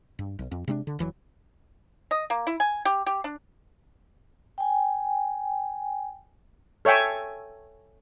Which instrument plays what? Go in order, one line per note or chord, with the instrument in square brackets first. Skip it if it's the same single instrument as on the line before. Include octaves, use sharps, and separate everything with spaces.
[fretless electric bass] G2
B1
F2
C3 G#3 C#4 D4
D3
F1 E3 F#3
[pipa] D#5
A#3
E4
G#5
G4
G4
D4
[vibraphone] G5 G#5
[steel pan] A4 C#5 E5 G5 G#5